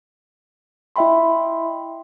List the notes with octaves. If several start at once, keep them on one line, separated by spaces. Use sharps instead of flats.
E4 D#5 E5 G5 B5 C6